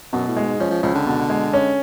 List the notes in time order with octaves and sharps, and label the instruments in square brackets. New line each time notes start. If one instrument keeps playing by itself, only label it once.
[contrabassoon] F#2 [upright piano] B2
[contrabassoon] A2
[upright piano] G#3
[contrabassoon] G#2
[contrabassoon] F3 [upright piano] C#4
[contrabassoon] F3
[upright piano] C#2 [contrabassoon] F3
[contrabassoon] D3
[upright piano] B2
G#3
C#4